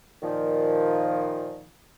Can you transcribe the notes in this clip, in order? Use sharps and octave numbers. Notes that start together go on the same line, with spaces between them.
A#2 D#3 F3